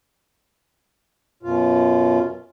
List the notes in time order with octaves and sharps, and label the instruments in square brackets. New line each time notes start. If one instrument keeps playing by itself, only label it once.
[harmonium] F#2 B2 F4